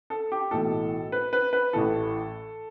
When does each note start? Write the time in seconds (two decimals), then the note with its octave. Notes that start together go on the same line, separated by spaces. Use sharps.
0.10 A4
0.32 G4
0.51 B1 A2 E3 A4
1.12 B4
1.33 B4
1.53 B4
1.73 A1 A2 E3 A4